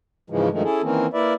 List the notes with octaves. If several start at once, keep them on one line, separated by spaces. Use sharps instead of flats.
G#2 C#3 E3 F3 G#3
G2 D#3 F3 G#3 A3
C#4 E4 G#4 A4
D#3 E3 A#3 C4 C#4
A#3 E4 B4 D5 E5